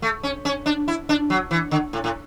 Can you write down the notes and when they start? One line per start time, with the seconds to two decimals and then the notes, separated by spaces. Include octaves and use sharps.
0.02 A3
0.23 C#4
0.45 C#4
0.66 D4
0.88 E4
1.09 D4
1.30 F#3
1.51 E3
1.71 D3
1.93 A2
2.04 A2